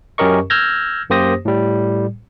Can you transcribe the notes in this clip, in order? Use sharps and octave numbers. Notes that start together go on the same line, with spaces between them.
F#2 C#4 G4 A#4 D#5 C#6
E6 F6 G6 G#6 A#6
F#2 A#3 G4 C5 D#6 A#6
A2 G3